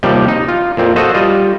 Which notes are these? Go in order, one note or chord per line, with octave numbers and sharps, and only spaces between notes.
D#2 C3 F3 G3 G4
D#4
F4
F2 A#2 C4
F#4 A4 C5 D#5
G3 F4 D#5